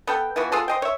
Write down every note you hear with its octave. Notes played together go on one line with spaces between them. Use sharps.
B3 A4 G5
E3 F3 B3 F#4
B3 F4 G#4 A4
C5 D#5 G5
C#5 E5